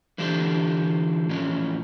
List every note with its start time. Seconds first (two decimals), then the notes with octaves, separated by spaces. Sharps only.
0.18 D3 E3 D4 F4 G4 C5
1.29 A2 E3 F3 C#4